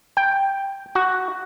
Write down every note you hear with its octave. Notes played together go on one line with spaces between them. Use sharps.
G5
F#4